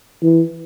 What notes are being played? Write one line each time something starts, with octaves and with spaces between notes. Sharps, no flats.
E3